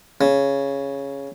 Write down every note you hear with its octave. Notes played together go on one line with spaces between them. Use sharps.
C#3